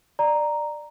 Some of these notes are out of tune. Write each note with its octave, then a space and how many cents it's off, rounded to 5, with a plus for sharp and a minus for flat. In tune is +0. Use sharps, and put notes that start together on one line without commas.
D5 +15 A#5 +0